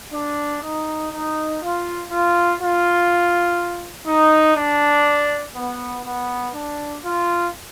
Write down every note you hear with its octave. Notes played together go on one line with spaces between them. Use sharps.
D4
D#4
D#4
F4
F4
F4
D#4
D4
B3
B3
D4
F4